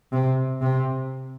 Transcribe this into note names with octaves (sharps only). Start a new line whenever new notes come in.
C3
C3